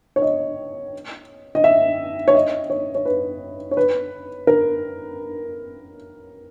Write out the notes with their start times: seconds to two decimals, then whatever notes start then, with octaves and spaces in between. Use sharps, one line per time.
0.16 C#5
0.22 D#5
1.55 D#5
1.64 E5
2.28 C#5
2.35 D#5
2.70 C#5
2.95 C#5
3.05 B4
3.71 C#5
3.77 B4
4.47 A#4